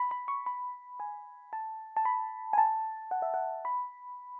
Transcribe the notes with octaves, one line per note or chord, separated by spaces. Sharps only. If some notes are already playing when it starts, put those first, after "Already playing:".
Already playing: B5
B5
C#6
B5
G#5
A5
A5
B5
G#5
A5
F#5
E5
F#5
B5